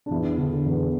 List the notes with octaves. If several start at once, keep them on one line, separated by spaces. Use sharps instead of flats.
D4
E2 E4
D3
E2